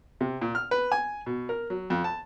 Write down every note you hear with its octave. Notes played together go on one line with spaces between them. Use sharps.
C3
A#2
F6
B4
G#5
B2
A#4
F#3
F2
A5